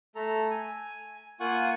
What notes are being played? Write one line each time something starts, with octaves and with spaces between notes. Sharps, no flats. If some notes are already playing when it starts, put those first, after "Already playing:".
A3 A4 A#5
G#5
A#3 F4 F#5 G#5 C#6